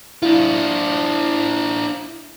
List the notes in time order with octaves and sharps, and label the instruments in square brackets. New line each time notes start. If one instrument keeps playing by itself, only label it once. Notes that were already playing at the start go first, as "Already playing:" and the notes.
[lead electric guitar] D4 F4 [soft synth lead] E4